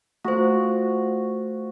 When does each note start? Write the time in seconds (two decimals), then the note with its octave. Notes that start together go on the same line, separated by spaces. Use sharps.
0.25 A3 F4 F#4 C5